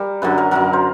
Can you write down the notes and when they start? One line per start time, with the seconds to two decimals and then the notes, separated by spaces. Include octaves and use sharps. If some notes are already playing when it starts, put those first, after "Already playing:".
Already playing: G3 A#4
0.22 F#2 D3 F#3 B4
0.38 A#4
0.51 F#2 D3 F#3 A#4
0.73 C5